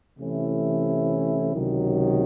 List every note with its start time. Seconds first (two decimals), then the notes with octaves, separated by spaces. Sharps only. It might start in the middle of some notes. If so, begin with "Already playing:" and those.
0.19 C3 E3 A3 C#4 E4
1.54 C#2 C3 D#3 F#3